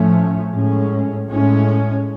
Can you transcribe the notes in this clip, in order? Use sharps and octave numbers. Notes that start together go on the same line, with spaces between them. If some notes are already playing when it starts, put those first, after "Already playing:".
Already playing: A2 F3 A3 C#4
A2 G#3 C#4
A2 G#3 C#4